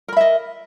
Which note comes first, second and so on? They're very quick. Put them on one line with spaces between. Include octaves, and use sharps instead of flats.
A#4 B5 E5 D#5